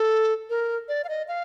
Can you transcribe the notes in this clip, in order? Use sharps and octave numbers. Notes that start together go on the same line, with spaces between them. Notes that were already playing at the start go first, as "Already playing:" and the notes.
Already playing: A4
A#4
D5
F5
D#5
F5